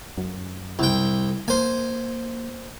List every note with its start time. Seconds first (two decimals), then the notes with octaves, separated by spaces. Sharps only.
0.18 F#2
0.79 C2 G5
1.48 A#3 C5 G#5